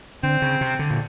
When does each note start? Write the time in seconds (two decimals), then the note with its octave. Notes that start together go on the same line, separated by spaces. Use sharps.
0.23 D3 C4
0.42 C#3
0.61 C3
0.79 D3
0.90 A#2